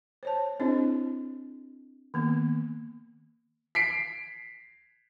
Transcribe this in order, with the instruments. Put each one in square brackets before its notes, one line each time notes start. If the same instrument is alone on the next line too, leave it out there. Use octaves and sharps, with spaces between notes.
[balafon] C5 C#5 A5
C4 D4 E4 G#4 C5 D#5
D#3 A#3 B3
[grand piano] B6 C7 D7